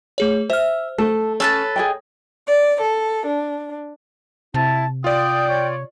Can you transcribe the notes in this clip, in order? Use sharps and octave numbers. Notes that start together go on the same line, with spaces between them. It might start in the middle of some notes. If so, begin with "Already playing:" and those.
A3 G#4 C#5
C5 E5 F6
A3 A4
C#4 A4 B4 C#5 A5
G#4 D#5 G5
D5
A4
D4
C3 E4 A5
F4 D5 G5 D#6
C#5